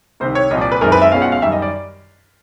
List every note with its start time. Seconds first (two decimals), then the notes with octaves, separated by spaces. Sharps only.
0.20 C2 C3 D#3 C5
0.35 C#5
0.50 C2 A#2 F3 D#5
0.61 D5
0.72 B4
0.81 F#2 D#3 G#3 C4 E4 A#4
0.92 B4
1.02 E5
1.12 B1 B2 G#3 C#4 F4 F5
1.22 F#5
1.32 F5
1.42 F#2 D#3 G3 E5
1.52 D#5
1.62 D5